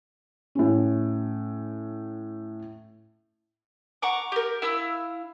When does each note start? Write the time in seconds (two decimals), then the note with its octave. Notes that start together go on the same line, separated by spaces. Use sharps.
0.55 A2 C#4
4.02 F#5 A#5 C#6 D6
4.32 G4 A#4
4.62 E4 F5 E6